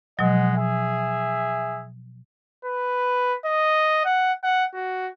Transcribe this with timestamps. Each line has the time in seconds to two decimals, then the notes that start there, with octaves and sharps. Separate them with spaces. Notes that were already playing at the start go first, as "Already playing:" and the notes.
0.19 B2 F3 F#3 G#3 D#5 F#5
0.56 G#4 E5
2.65 B4
3.45 D#5
4.05 F#5
4.44 F#5
4.74 F#4